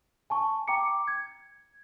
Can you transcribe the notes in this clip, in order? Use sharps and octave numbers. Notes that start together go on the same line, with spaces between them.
G#5 A5 C#6
G5 A#5 D6 C#7
G#6